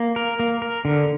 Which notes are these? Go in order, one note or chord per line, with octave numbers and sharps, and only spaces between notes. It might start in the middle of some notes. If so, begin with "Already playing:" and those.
Already playing: A#3
A#4
A#3
A#4
D3